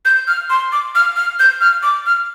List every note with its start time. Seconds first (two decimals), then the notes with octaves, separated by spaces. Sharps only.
0.05 G6
0.28 F6
0.50 C6
0.72 D6
0.95 F6
1.16 F6
1.39 G6
1.61 F6
1.83 D6
2.06 F6